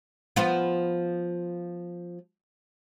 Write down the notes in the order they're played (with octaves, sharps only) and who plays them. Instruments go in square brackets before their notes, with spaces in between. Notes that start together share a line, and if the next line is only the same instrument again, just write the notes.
[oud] F3 B3 F4